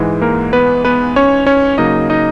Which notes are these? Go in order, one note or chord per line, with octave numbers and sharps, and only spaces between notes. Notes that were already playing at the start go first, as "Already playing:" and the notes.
Already playing: G#2 E3 G#3
A#3 A#4
B3 B4
B3 B4
C#4 C#5
C#4 C#5
C#3 F#3 A#3 D#4 D#5
D#4 D#5